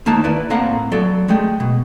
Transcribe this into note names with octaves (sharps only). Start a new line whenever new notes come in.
D#2 A#3 D#4 A5
E4 B4 D5
A2 A#3 C4 F5 F#5 A#5
F#3 A4 D5
G#3 A3 G#4 G5
B2